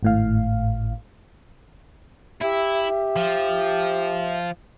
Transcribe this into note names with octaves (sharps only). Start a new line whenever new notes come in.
G#1 A2 F5
E4 G4 E5
F3